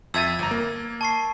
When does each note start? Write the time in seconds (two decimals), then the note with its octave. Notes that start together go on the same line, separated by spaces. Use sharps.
0.14 F2 E5 E6 G#6 A6 D#7
0.39 G1 A#5
0.51 A#3
1.01 A5 C#6 C7